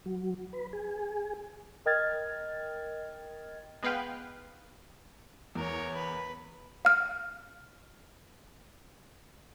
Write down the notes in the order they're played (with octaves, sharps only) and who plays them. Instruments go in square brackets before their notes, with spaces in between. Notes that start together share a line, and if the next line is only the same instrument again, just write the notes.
[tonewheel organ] F#3
B4
G#4
[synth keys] A#4 D#5 G5 F6 G#6 A6
[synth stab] G#3 B3 B4 F5 G5
[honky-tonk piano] E2 [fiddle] A#4 C#5
[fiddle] B4
[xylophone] F5 F6